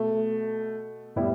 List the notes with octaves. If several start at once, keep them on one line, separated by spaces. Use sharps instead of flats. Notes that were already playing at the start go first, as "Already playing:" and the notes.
Already playing: B2 A3
A2 G3 B3 E4